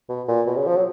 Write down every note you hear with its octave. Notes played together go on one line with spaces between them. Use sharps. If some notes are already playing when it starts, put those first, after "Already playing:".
B2
A#2
B2
C#3
F3
F#3